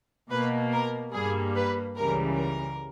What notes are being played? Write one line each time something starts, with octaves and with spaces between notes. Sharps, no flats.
B2 A#3 B4
A#4
G2 G3 A#3 G#4
B4
C#2 C#3 E3 G3 A#4
A#4